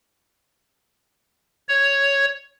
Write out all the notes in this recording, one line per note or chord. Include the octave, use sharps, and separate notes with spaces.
C#5